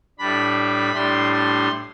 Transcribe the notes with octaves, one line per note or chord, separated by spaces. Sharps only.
A2 G3 D4 B5
A2 G3 D4 C6
C6